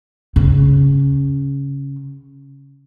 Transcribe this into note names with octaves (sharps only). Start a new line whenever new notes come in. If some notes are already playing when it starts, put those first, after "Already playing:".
C#3 C#4